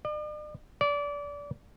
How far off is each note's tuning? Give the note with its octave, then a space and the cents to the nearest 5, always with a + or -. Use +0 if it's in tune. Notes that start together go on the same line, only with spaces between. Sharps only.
D5 +45
D5 -25